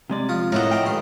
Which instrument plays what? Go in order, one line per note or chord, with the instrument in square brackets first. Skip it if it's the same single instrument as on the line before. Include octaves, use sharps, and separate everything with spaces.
[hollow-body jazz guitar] C3 G#3 D5
[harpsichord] F3 F4 D#6
[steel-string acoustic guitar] A2 A3 D#5 [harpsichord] A#4 C5 F#5
[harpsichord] F5 A#5 [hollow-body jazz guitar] G5
[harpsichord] A1 D#3 C6 [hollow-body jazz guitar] G#2